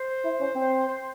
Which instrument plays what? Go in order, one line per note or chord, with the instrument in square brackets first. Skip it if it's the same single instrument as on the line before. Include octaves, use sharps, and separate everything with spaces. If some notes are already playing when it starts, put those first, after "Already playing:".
Already playing: [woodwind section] C5
[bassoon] E4
C#4
C4
[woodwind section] C5
C5